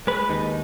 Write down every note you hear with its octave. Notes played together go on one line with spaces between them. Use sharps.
G#3 B4
D#2 D#4